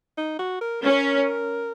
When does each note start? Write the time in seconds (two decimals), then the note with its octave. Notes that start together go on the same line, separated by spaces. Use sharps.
0.18 D#4
0.39 F#4
0.61 A#4
0.82 C#4 A#4